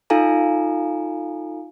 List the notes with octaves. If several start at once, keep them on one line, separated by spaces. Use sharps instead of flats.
D#4 F4 A4 F5 G#5 A#5